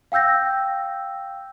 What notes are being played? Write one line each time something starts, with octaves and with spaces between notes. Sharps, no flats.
F5 G5 E6 G6 A#6